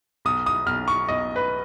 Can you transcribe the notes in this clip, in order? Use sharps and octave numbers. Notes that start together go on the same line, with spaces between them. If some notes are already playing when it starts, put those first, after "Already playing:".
B1 D#6
D#6
B1 F6
C#6
B1 D#5
B4